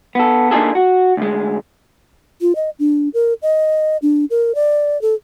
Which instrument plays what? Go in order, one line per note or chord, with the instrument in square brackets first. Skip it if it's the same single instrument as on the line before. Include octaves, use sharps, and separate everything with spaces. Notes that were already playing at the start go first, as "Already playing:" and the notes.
[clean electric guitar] B3 A4
A#3 D4 D#4 F4 G#4 A4
F#4
D2 G#3
[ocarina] F4
D#5
D4
A#4
D#5
D4
A#4
D5
A4